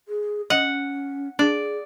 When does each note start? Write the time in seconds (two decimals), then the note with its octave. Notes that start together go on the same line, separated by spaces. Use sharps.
0.08 G#4
0.50 C#4 D#5 F#5
1.39 D4 G#4 D5